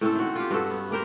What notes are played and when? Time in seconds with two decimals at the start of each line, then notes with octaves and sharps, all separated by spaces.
0.01 A2 C4 C#4 A4
0.15 D#3 F#4
0.36 F4 G4
0.51 G2 F#4 G4 A4
0.70 B3
0.91 A#3 G4 A#4 C5